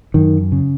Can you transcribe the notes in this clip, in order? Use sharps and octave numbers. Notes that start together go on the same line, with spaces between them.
F#2 D#3
C#3